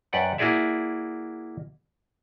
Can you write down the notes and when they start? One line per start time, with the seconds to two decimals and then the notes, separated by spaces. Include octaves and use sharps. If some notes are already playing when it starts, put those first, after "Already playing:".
0.13 F#2 B4 D5 F#5 G5
0.38 A#3 E4 F#4 G#4 D5 E5